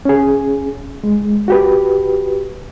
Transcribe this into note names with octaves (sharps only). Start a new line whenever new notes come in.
C#4 G#4
G#3
F#4 G4 B4